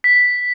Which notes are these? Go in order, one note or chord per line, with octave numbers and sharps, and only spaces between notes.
B6